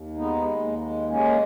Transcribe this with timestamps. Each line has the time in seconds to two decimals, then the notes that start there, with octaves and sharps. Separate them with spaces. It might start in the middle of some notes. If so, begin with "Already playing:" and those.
Already playing: D#2
0.16 G#3 B3 D#4
0.47 D#2
0.79 G#3
1.09 G#3 A#3 C#4